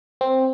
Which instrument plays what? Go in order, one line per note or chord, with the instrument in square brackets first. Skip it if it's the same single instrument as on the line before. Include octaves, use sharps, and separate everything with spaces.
[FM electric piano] C4